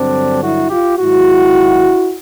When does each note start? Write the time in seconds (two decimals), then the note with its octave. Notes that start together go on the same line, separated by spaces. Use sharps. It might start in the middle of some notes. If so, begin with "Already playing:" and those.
Already playing: G2 D3 F#3 C4 D4
0.42 E4 F#4
0.70 F4 G4
0.99 G#2 D#3 F#3 E4 F#4